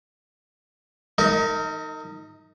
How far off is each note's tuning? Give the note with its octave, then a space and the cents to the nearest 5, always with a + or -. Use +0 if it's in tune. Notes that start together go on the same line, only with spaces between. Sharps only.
D#4 +0 A#4 -30 D#5 +35